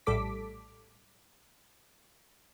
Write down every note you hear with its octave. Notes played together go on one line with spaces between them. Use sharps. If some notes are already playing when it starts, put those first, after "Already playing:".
A#1 A2 G3 A4 D6 B6